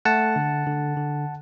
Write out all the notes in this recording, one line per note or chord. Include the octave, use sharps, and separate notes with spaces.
A3 F#5 A5
D3
D3
D3